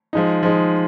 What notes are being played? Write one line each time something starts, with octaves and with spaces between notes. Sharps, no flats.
F3 G#3 D#4
F3 G#3 D#4